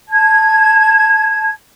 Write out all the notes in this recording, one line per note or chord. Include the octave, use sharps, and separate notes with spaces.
A5 G#6